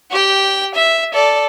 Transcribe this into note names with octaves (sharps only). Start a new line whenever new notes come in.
G4 G5
E5
A4 D5